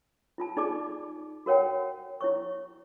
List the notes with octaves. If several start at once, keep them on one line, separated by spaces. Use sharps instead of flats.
E4 F4 A5
D#4 G#4 D5 A5 D6
F#4 A#4 C#5 F#5 G5
E4 C#5 C#6